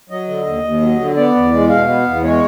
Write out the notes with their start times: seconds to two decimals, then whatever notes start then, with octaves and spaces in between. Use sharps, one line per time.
0.10 F#3 D#5
0.28 D3
0.46 D#2
0.63 D#2
0.81 F#3
0.99 D3
1.17 B3 D5
1.35 E2
1.53 G#3
1.70 B2 F5
1.88 B3
2.06 E2
2.24 G#3 C#5